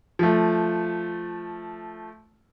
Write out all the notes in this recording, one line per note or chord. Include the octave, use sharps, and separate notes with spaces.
F3 A3